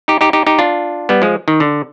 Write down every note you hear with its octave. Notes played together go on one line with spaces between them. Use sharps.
D#4 G4
D#4 G4
D#4 G4
D#4 G4
D4 F4
G3 B3
F3 G#3
D#3
D3